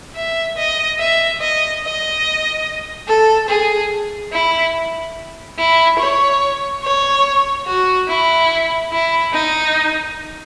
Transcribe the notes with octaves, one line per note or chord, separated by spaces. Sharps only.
E5
D#5
E5
D#5
D#5
A4
G#4
E4
E4
C#5
C#5
F#4
E4
E4
D#4